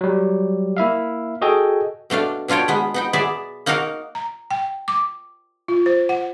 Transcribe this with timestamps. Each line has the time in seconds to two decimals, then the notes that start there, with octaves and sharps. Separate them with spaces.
0.01 F#3 G3
0.77 A#3 E4 E5 F5
1.42 F#4 G#4 A4 D#5 G5 G#5
2.10 B2 A3 D4 F5
2.48 B2 D4 F4 C#5 G5
2.68 G#3 B3
2.94 B3 D#4 G5
3.13 B3 G#4 D5 E5
3.66 A#3 D#4 F#4 A#4 F5
4.15 A#5
4.51 G5
4.88 D6
5.68 F4
5.86 C5
6.09 F#5